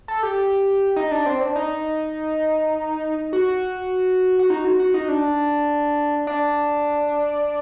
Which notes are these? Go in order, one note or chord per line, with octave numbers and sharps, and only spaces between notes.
A4
G4
D#4
D4
C4
D4
D#4
F#4
F#4
D#4
F#4
F#4
D#4
D4
D4